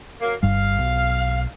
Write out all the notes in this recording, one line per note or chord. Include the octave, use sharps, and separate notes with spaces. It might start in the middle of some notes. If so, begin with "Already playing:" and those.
F#3 A#3
G1 G2 G3 F5
B1